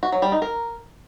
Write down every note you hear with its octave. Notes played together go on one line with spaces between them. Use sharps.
F#4
F#3
G3
D#4
A#4